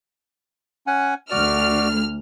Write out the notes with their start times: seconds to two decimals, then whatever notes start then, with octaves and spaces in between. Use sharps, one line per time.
0.87 C#4 F#5 G#5
1.31 D2 F#4 D5 F6